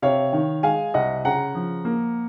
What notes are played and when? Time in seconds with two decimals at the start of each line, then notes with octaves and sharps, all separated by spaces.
0.02 C3 C#5 F5
0.33 D#3
0.63 G#3 F5 G#5
0.94 C2 D#5 F#5
1.25 C#3 F#5 A#5
1.55 F3
1.85 A#3